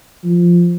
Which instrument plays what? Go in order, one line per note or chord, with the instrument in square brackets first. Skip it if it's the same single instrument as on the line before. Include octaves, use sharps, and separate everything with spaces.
[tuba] F3